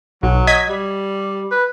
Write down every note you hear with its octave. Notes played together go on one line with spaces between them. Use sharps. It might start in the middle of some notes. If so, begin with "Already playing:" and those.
B1 F#3
D#5 G#6 B6
G3
B4